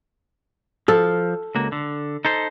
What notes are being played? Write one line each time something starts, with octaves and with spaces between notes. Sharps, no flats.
F3 A4
C#2 A#3 F#4
D3
D#4 A4 C5